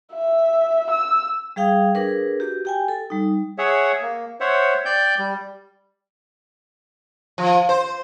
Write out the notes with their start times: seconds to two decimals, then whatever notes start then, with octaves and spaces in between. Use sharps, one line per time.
0.13 E5
0.90 E6
1.56 G3 G#4 F5 G5 D#6
1.95 D4 G#4 A#4 B4
2.40 F#4 G4
2.65 G4 G5 G#5
2.88 A4
3.10 G3 D#4
3.58 G#4 C#5 E5 F#5
4.01 A#3
4.40 C5 C#5 E5 F#5
4.85 D5 G5 G6
5.19 G3
7.38 F3
7.69 C5